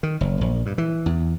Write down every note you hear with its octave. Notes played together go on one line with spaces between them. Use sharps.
D#3
F#1
A#1
G2
E3
E2